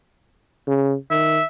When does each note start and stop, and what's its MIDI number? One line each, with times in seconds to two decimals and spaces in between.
0.68 0.95 49
1.11 1.40 51
1.11 1.45 76